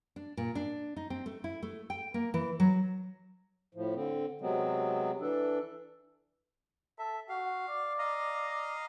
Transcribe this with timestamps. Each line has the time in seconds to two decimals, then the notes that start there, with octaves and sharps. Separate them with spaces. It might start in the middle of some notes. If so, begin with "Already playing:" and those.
0.16 D4
0.37 A#2
0.55 D4
0.96 D#4
1.10 C4
1.26 A3
1.44 E4
1.63 A3
1.90 G5
2.14 A#3
2.34 E3
2.60 F#3
3.75 A2 F3
3.95 D3 C4
4.41 C3 F#3 G#3 B3 C4
5.21 E3 D4 A4
6.99 A4 E5
7.29 F#4 F5
7.69 D5
7.99 D#5 F5 A#5